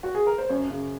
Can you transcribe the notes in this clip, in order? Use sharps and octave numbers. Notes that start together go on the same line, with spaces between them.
F#4
G#4
A#4
C5
F#2 C#5
C#3